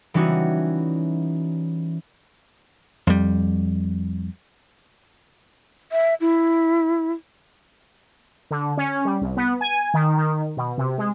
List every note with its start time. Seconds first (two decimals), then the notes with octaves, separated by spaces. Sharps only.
0.14 E3 G3 C#4 D#4 F#4
3.07 F2 G3
5.92 E5
6.21 E4
8.51 D3
8.77 C#4
9.05 G3
9.21 C2
9.37 B3
9.61 G#5
9.94 D#3
10.17 D#3
10.57 B2
10.78 C3
10.98 G#3